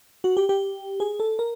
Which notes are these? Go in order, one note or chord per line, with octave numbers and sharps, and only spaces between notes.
F#4
G4
G4
G#4
A4
A#4